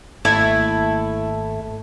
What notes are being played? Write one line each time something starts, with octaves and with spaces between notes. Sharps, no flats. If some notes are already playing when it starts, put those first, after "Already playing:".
G#1 A3 A#3 E4